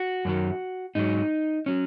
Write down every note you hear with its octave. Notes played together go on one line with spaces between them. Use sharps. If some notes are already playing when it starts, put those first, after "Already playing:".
Already playing: F#4
F#2 D#3 F#3
G#2 F#3 D#4
F#3 C#4